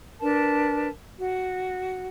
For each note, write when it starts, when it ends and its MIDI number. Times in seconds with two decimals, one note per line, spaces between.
0.21 0.89 62
0.21 0.89 70
0.21 0.89 71
0.21 0.89 81
1.19 2.07 66